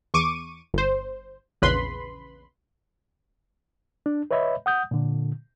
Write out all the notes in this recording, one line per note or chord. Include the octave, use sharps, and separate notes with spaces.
E2 C#6 D6 D#7
G1 C5
A#1 E2 C#3 B4 B5 C6
D4
B4 C#5 D#5 E5 B5
F#5 D#6 G6
A#2 D3